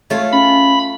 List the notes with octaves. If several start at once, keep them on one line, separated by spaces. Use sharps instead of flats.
A3 F4 C#5
C#4 B5